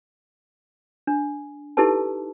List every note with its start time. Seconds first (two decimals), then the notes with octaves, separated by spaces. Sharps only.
1.07 D4
1.77 D#4 E4 G4 A4 B4 A5